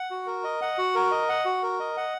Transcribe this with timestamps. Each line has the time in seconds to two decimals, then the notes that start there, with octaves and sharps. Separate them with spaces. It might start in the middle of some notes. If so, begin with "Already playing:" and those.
Already playing: F#5
0.11 F#4
0.26 A#4
0.44 D#5
0.62 F#5
0.78 F#4
0.95 A#4
1.11 D#5
1.29 F#5
1.45 F#4
1.63 A#4
1.80 D#5
1.97 F#5